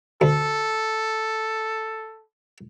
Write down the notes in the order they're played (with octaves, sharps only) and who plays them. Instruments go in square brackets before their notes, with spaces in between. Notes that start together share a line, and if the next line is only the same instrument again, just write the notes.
[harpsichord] D2 [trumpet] A4